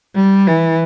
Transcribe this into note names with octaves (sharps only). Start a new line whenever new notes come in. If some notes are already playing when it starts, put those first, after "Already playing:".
G3
E3